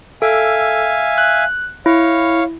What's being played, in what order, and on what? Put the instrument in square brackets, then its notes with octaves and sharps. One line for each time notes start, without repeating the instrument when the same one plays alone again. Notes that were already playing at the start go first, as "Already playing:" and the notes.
[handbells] A4 [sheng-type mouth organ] E5 F5 G#5
[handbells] F#6
[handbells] E4 [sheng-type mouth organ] C#5 F5